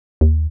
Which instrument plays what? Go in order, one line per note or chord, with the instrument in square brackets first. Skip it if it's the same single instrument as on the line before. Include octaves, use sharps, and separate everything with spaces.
[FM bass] D#2